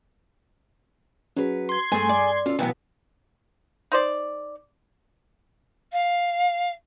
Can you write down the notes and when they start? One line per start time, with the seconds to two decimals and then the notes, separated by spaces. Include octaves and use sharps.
1.36 F#3 C#4 G#4 B4
1.69 C6 G#6
1.92 G2 A3 C4 G#4 G#5
2.09 D5
2.46 C#4 F4 A4
2.59 B2 E3 F#3 B3 E4 F5 G5 G#5
3.92 D#4 C5 D5
5.92 F5